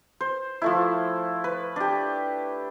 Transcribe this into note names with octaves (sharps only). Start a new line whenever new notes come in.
C5
F3 A3 E4
B4
D4 G4